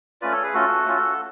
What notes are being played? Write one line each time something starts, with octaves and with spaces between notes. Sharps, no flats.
A3 C#4 F4 B4 D5
A4 C#5
G#4 B4
A3 C#4 F4 F#4 A4
A3 C#4 F4